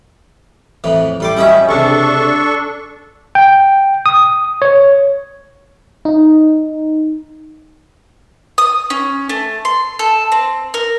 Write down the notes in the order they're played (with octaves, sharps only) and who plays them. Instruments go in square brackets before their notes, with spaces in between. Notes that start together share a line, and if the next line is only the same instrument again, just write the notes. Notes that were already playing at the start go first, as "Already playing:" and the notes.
[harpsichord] F2 A2 E3
[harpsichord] A2 C6 D6 [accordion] G3
[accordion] F#2 G3 C#4 [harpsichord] E4 D#5 E5
[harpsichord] C#2 C3 [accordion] D4 A4 C#6
[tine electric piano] G5
D#6
C#5
[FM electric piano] D#4
[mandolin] D#6
C#4
A3
C6
A4
C4
A#4